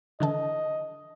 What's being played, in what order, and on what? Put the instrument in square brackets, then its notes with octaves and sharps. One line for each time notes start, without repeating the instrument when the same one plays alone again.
[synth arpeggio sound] D3 E3 A4 [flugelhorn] D#5